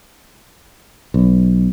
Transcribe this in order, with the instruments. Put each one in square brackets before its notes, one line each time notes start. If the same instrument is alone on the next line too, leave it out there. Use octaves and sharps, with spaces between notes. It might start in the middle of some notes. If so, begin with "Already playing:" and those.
[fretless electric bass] B1